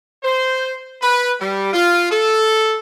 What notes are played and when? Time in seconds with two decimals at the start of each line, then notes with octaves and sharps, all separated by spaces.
0.24 C5
1.02 B4
1.40 G3
1.73 F4
2.11 A4